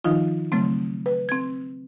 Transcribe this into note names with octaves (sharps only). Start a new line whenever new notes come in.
D#3 F3 D#4 F4
C#3 F#3 A3 C4
B4
C4 G#6